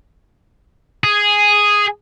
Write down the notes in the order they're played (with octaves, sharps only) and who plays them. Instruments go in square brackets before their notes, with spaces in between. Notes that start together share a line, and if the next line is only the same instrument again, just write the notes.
[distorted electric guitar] G#4